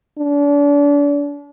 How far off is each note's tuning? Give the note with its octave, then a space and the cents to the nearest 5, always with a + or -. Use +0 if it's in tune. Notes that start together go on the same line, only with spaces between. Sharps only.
D4 -35